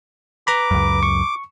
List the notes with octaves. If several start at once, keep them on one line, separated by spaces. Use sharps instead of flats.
B4 A#5 B5 D6
C#2 F#2
C#6